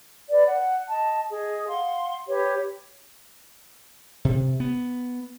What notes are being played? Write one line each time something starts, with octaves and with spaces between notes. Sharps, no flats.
B4 D5
F#5
D#5 A5
G#4 D#5
F5 F#5 C6
G4 B4 C#5
C3
B3